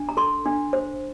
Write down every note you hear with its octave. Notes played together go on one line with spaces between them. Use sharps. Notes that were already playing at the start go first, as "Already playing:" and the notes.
Already playing: D4
A#5
A4 C6
D4
C5